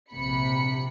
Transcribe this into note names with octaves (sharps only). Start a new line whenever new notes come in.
A#1 C3 B5 C#7